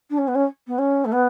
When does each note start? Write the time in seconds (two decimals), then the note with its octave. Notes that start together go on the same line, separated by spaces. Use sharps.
0.10 D4
0.18 C#4
0.27 B3
0.35 C#4
0.67 B3
0.78 C#4
1.05 A3
1.12 B3